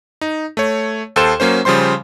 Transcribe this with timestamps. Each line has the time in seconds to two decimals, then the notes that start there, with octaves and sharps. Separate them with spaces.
0.21 D#4
0.57 A3 C#5
1.16 D#2 A4 C5 C6 E7
1.40 F#3 A#3 C#4 C5
1.65 C#3 F3 G3 C5 C6